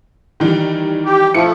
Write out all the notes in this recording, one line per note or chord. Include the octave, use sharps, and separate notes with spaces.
D#3 E3 G3
G4
F3 A3 E4 C#7